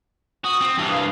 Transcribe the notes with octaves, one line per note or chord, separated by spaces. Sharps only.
F#4 D#6
C4
G2 E3
F5